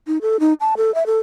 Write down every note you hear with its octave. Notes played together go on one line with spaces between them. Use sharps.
D#4
A4
D#4
A5
A4
E5
A4